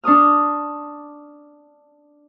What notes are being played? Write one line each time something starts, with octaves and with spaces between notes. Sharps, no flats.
D4 C#6 D#6 F6